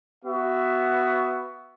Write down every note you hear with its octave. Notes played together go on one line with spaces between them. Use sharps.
B3 F#4 E5